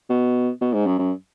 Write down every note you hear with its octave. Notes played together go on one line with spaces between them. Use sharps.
B2
B2
G#2
F#2
F#2